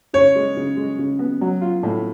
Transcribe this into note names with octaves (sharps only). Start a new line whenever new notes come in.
C#3 C#5
G#3
C#3
G#3
C#3
B3
F#3
F4
A2